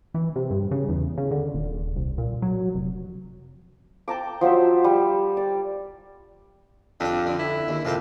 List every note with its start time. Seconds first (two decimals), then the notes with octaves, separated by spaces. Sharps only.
0.14 E3
0.36 C3
0.51 G2
0.71 C#3
0.89 E2
1.18 C#3
1.31 D3
1.54 D#1
1.96 C2
2.18 A#2
2.42 F#3
2.75 F1
4.08 G5 A5 A#5 D6
4.41 F3 F#3 C5 E5
4.84 G3
5.37 D5
7.00 F2 D4 G4
7.27 D3
7.39 E4
7.68 D#2
7.85 F2 C3 A#3 G4